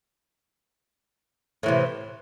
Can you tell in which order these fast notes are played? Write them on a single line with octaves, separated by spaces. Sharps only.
A2 E3 C3